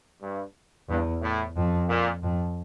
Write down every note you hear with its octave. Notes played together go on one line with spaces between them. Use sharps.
G2
E2 G2
A2
F2
A#2
F2